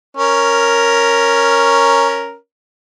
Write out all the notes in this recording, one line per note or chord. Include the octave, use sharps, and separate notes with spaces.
C#4 A#4